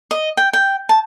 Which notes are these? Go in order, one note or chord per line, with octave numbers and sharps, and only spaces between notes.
D#5
G5
G5
A5